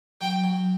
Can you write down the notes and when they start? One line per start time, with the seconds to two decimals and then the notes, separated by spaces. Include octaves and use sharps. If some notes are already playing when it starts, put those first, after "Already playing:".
0.21 F#3 G5
0.44 F#3